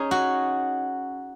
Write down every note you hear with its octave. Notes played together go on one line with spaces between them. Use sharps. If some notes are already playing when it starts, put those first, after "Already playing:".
Already playing: C#4 D#4 G#4
F#4